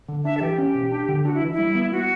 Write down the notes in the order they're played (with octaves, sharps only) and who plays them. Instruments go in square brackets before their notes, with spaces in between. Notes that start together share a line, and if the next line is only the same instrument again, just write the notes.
[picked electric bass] D3
[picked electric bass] D4 [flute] E5
[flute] A4
[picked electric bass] E3 [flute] G4
[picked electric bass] C#4
B2
D4
D3
[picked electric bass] D4 [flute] F#4
[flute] E4
[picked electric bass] E3
[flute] E4
[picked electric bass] G3
B3
[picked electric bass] B3 [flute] F#4